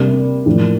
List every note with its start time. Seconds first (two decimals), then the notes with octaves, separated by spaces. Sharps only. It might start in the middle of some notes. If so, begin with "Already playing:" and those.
Already playing: C3 G3 A#3 D4
0.46 A2 F3 A#3 D4